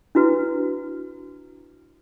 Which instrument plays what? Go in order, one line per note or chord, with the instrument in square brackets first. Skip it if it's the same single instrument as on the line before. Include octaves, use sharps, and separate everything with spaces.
[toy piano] D4 E4 F#4 B4